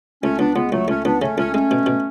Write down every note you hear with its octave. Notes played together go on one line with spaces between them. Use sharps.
C#2 A3 C#4
C#2 B3 D4
C#2 G#3 B3
C#2 F#3 A3
C#2 A3 C#4
C#2 B3 D4
C#3 A3 C#4
C#2 A3 C#4
G#3 A3 C#4
B2
B2